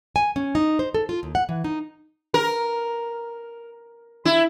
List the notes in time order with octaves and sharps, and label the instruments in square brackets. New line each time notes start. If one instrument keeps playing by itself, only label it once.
[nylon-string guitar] G#5
C#4
D#4
C5
A4
F4
D#2
F#5
E3
D#4
[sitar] A#4
E4